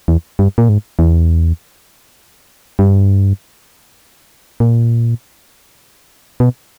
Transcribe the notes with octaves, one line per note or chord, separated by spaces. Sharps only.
E2
G2
A#2
G#2
E2
G2
A#2
B2